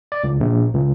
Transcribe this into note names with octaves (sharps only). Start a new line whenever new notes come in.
D5
C#2
A#1
C#2